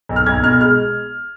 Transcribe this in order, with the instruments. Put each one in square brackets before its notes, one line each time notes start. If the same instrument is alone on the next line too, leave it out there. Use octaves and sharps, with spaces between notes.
[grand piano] B1
F6
B1 G#6
B2 F6
G#3 F6